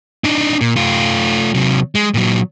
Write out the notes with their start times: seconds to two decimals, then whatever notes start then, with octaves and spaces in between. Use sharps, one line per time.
0.24 D4 D#4
0.61 A#2
0.76 A3 F4
1.54 C3 F#3
1.95 G#3
2.14 A#2 F#3